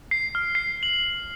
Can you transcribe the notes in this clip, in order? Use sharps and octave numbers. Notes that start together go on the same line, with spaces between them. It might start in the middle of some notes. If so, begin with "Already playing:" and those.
C7
F6
C7
F#7